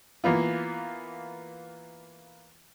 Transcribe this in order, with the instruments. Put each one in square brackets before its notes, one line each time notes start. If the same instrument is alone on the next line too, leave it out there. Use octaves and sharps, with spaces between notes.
[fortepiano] E3 A#3 B3 F4